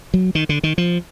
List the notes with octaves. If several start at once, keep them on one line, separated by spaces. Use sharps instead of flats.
F#3
D#3
D3
D#3
F3